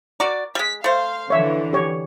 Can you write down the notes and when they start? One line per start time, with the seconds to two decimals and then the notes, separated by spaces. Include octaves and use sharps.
0.20 F#4 D5 A#5 D6
0.55 G3 G#3 B6
0.84 A3 C5 F5
1.30 D3 E3 C#5 E5
1.73 G4 C#5